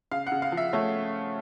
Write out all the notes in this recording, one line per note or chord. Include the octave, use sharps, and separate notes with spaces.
C#3 F5
F#5
C#3
F5
F3
E5
A3 C#5